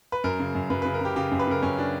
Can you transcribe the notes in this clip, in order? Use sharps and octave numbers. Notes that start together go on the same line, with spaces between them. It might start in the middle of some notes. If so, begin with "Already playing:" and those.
B4
F#2 A#4
C#3
F#2
F#2 B4
C#3 B4
A#4
C#3 G4
C#3 G4
F#2
B4
C#3 A#4
F#2 C#4
D4